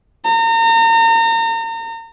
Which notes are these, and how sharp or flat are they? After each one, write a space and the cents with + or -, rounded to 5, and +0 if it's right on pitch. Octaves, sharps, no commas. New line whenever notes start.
A#5 -35